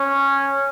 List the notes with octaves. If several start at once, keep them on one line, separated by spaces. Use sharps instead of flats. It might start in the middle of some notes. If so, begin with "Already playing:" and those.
Already playing: C#4